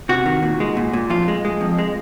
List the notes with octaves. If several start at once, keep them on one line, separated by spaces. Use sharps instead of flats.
C3 F#4
D#3
A#2
G#3
A#2
A#2
F2 F4
G#3
G#3
F2
G#3